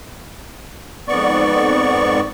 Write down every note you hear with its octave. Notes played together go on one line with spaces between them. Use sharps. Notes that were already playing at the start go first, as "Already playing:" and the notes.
F2 G#2 B3 D5 C#6